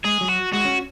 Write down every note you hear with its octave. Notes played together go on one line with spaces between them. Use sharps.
G#3 G#4
F#3
F#4
G#3 F#4
C#4